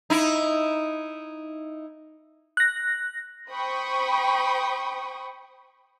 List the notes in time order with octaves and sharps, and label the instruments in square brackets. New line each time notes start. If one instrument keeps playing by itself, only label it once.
[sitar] D#4 E4
[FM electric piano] F#6 A#6
[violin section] C5 G5 B5 C#6 D#6